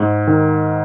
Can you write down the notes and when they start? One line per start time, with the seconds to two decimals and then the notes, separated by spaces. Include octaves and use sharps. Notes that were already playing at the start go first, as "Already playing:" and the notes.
Already playing: G#2
0.27 D#3